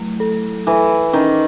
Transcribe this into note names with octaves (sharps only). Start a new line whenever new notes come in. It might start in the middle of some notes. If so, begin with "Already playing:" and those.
Already playing: F#3 A3 E4
A4
E3 A4
D#3 C#4